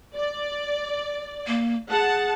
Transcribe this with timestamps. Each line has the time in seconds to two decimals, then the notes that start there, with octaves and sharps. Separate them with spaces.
0.16 D5
1.47 A#3
1.91 G#4 F#5 A5